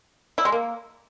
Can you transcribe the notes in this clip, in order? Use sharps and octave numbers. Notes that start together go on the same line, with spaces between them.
E4
G#3
A#3